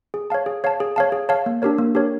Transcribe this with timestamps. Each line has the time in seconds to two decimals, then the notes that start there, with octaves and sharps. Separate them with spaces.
0.14 G#4
0.30 C#5 F5 A5
0.46 G#4
0.64 C#5 F5 A5
0.80 G#4
0.96 C#5 F5 A5
1.12 G#4
1.29 C#5 F5 A5
1.46 A#3
1.62 D4 G4 A#4 C#5
1.78 A#3
1.95 D4 G4 A#4 C#5